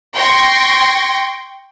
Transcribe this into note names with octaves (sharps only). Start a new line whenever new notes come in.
G5 C6 C#6 G#6 A#6